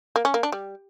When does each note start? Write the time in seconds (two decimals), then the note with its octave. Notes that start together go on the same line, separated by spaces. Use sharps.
0.16 A#3
0.25 C#4
0.34 A#3
0.43 D4
0.52 G3